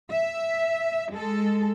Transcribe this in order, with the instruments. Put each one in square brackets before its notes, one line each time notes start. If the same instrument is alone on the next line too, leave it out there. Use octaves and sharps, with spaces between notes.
[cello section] E5
G#3 A4